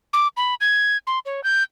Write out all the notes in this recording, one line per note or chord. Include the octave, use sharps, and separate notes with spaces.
D6
B5
G#6
C6
C#5
G6